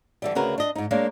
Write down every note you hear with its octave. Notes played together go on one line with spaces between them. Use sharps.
D3 E3 G3
D2 C#3 F#4 A#4 B4
D4 D#5
G#2 D#4
G#3 A#3 D4 A#4 C#5 F5